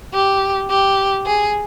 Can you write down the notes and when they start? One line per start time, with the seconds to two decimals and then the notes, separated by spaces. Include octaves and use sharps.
0.14 G4
0.70 G4
1.26 G#4